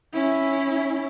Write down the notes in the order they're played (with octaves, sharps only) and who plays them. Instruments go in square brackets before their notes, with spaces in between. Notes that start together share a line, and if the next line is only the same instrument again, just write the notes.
[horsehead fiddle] C#4 E4